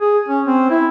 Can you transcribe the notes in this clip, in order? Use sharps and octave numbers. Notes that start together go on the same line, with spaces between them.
G#4
C#4
C4
E4